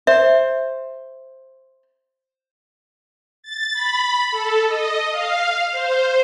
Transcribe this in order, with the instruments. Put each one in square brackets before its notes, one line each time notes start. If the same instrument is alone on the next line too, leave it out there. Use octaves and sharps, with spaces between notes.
[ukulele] C5 [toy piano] E5
[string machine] A6
B5
A4
D#5
F5
C5